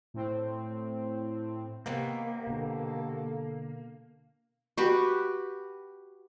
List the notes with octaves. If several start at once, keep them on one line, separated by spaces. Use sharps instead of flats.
A2 C4
C3 D#3 A#3 B3
B2 D3 A4
F#4 G4 B4